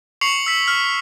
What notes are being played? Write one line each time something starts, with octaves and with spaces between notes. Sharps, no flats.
C#6 C7 C#7 F7 F#7
E6 B6 F#7
F6 B6